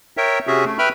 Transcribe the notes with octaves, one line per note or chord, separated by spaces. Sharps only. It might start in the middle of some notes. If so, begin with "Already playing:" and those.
A#4 C#5 E5 G5
C3 C#4 F#4 G#4 E5
A3
B4 E5 G5 B5 F6